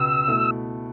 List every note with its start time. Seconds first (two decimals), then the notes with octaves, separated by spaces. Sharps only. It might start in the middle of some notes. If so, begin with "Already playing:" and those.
Already playing: C#2 B2 B3 E6
0.28 B2 A3 E4